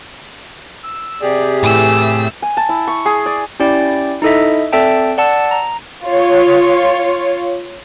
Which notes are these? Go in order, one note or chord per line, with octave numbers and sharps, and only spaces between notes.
E6
C3 G4 G#4 D5
A2 E3 A3 E6
G#5
A5
E4
C#6
G#4
D5
C#4 E4 G4 D5 G5
D#4 E4 A4 D#5 E5
C4 A4 D5 E5 G5 A5
D5 F#5 A5 E6
A#5
F4 C#5